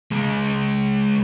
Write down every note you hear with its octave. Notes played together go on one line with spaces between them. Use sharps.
C#2 G#3